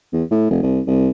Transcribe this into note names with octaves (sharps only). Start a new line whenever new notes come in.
E2
A2
F1
C2
C2